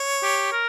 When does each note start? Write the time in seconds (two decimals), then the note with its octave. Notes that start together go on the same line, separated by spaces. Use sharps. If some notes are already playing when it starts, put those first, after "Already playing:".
Already playing: C#5
0.23 G4
0.52 A#4